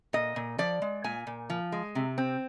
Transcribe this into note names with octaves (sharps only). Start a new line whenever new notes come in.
A#2 D#5
A#2
F3 D5
G#3
A#2 G#5
A#2
F3
G#3
C3
C4